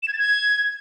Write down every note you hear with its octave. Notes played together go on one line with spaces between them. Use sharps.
E7
G#6
A6
G#6